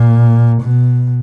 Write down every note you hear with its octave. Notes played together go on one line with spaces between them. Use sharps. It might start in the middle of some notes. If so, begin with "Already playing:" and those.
Already playing: A#2
B2